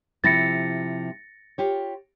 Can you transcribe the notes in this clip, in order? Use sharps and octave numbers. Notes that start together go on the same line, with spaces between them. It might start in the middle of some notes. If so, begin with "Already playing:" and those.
C3 F3 E4 A6 A#6 C#7
F4 G4 C#5